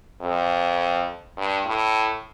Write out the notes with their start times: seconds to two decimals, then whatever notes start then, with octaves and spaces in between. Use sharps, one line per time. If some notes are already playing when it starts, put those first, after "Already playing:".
0.21 F2
1.37 G2
1.66 A2